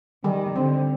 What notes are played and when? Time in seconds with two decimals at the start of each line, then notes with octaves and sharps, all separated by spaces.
0.24 D#3 G3
0.55 D3 C4